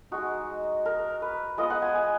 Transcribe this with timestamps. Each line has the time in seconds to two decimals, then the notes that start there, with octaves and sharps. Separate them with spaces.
0.12 G#3 D#4 F#4
0.86 A#4
1.22 B4
1.58 G#3 B3 F4 D#5
1.70 F#5
1.82 G#5
1.95 G#5